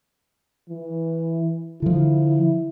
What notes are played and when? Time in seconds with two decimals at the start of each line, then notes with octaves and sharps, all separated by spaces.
0.70 E3
1.82 D3 F3 E4